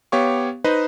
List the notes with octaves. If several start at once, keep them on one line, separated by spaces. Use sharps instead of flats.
B3 G4 C#5 F5 C#6
D#4 B4 C5 D#5